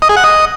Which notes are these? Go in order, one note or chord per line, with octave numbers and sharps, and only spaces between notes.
D#5
G#4
F#5
D#5